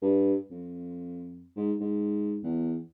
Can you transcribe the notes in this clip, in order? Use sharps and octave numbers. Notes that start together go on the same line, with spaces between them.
G2
F2
G#2
G#2
E2